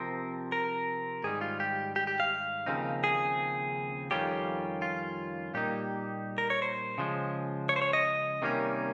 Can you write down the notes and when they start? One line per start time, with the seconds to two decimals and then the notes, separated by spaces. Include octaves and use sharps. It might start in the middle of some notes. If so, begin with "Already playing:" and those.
Already playing: C3 F3 C4 A#4
0.52 A#4
1.24 G#2 D#3 G3 G#4
1.41 F4
1.60 G4
1.96 G4
2.07 G4
2.20 F5
2.66 D#2 C#3 F3 C4 D#4
3.04 G#4
4.11 F2 D#3 G3 C#4 F4 G4
4.82 F4
5.54 A#2 G3 A#3 D#4 G4
6.38 A#4
6.50 C#5
6.62 C5
6.98 C#3 F3 G#3
7.69 C#5
7.76 C5
7.82 C#5
7.93 D#5
8.42 C3 D#3 G3 A#3 C#4